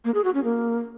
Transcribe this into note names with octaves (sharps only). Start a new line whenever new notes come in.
A#3
G#4
F#4
C#4
A#3